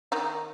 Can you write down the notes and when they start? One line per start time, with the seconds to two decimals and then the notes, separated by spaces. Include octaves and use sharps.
0.12 D#3 D#4